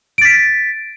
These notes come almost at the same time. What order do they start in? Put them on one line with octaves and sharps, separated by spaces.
D7 A6 B6